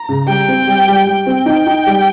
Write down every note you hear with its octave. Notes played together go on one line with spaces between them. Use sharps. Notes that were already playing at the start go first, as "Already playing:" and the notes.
Already playing: A#5
C#3
G3 G5
C4
G3
G3
G3 G5
C4
D#4
D#4
G3